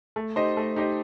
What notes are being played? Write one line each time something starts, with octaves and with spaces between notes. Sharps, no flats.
A3
D#4 G4 C5 D#5
A3
D#4 G4 C5 D#5